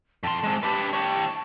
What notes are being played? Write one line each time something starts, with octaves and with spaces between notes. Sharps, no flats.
F2 A5 C6
G#3 C4
G4 B4 A5
G4 C#5 A5